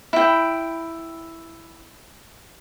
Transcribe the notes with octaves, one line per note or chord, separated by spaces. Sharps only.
E4 G5